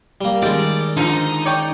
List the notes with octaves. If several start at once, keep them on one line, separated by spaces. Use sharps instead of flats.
G3 A#3
D#3 G3 G#3 D5
D3 F3 D#4
C#5 D5 G5